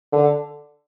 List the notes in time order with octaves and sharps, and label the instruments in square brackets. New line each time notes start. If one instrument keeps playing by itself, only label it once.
[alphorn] D3